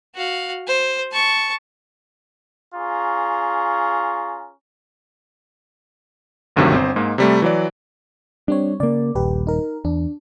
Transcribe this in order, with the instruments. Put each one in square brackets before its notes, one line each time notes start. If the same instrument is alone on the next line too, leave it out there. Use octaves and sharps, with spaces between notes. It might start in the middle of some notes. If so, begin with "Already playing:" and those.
[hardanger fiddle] F#4 F5
C5
A5 C#6
[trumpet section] C#4 F4 G#4 A#5 C#6
[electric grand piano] G#1 D2 G2 C3 D#3 F#3
G1 C4 C5
G#2 G#3 A#3
C3 G3 A3
E3 F#3 D5
[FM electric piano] G3 C4 C#5 [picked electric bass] D4
[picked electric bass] C#3 A#3 [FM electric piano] D5
[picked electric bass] D#1 [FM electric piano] A#1 G4 B4
[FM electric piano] D#4 A#4
[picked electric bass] E2 [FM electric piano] D4